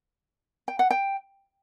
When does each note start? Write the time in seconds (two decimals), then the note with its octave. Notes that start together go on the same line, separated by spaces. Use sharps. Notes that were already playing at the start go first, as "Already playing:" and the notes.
0.68 G5
0.79 F#5
0.91 G5